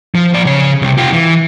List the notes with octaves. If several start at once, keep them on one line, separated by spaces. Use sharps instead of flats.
F3
F3 D5
C#3 C#5
C2 C3
F4 G4
E3